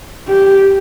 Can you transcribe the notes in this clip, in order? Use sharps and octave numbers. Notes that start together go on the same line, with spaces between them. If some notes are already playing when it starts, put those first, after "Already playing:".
G4